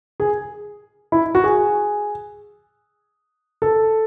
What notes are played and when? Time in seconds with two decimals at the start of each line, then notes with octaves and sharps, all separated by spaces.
0.20 G#4
1.12 E4
1.35 F#4
1.44 G#4
3.62 A4